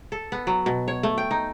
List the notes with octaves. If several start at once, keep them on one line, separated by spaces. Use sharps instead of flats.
A4
B3
F#3
B2
C#5
A3
G5
D#4